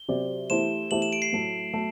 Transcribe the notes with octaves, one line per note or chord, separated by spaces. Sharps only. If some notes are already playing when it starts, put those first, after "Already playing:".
Already playing: G7
C3 F#3 C4 G4 D5
E3 A3 E4 G4 C5 E7
E3 A3 E4 G4 C5 F#7
E7
D7
C7
A2 F#3 A3
F#3 A3